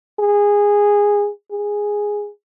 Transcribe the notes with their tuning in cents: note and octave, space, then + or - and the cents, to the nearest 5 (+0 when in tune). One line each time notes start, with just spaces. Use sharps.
G#4 -15
G#4 -5